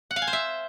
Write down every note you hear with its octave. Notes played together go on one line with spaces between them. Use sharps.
F#5
F5
G#5
C5
E5